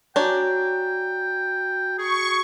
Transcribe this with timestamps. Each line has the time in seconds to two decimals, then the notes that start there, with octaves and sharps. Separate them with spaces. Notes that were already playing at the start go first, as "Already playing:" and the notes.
0.16 D4 F#4 C#5 G5 G#5 A#5
1.98 G#4 C#6